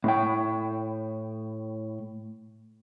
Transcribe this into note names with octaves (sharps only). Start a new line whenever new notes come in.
A2 G5